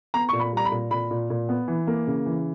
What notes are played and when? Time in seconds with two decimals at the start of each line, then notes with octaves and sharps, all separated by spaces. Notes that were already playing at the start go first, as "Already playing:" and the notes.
0.14 B3 A#5
0.29 A#2 C#6
0.39 B5
0.52 G3 A#5
0.65 B5
0.72 A#2
0.91 A#2 B5
1.11 A#2
1.30 A#2
1.49 B3
1.68 E3
1.87 A#3
2.07 C#3
2.26 E3